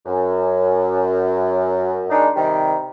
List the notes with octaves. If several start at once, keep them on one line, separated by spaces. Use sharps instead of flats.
F#2
D#3 G#3 D4 D#4
C3 D#3 G3